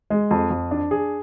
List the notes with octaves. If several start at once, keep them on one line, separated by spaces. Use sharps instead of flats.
G#3
F2
F2
D4
G#4